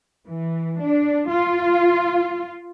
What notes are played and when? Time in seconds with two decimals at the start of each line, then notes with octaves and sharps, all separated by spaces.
0.27 E3
0.80 D4
1.29 F4